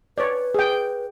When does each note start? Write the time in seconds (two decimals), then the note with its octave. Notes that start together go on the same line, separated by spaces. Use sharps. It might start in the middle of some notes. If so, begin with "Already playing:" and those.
0.18 B4 C#5 D5
0.55 G#4 G5